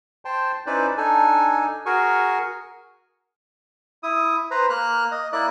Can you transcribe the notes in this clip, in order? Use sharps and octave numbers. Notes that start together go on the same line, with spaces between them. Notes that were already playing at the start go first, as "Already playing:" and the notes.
C5 G5 A5 C6
C#4 D#4 E4 B4 C5 D5
D4 D#4 A4 G#5
F#4 G#4 A#4 G#5 C#6
E4 D#6
B4 C5 A#5
A#3 F6 F#6
D#5
A#3 E4 D5 F#6